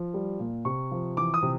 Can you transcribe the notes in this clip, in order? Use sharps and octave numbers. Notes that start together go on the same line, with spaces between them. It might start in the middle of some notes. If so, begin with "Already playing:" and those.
Already playing: F3
G3
A#2
C3 C#6
F3
E3 D6
D#6
C3